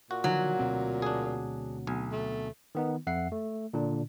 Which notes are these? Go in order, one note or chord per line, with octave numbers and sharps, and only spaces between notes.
A#2 F#4
D3 D#3 F3 F#3
D2 B2 C4
D4 G#4
B1 G#5
A3
D#3 B3 D#4
F2 E5 F#5 C7
A3
A#2 D3 D4